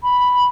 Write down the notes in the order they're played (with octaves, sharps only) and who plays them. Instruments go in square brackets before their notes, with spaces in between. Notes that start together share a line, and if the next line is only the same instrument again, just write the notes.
[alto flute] B5